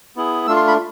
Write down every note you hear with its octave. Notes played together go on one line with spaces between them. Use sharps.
B3 E4 G#4
A3 D4 F4 E6
C6
B5